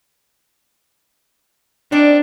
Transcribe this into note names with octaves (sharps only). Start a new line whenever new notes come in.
C4 D4 D#4 D5